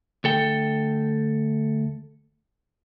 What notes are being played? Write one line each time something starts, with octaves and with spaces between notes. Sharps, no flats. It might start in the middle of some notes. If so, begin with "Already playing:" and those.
D2 A4 G5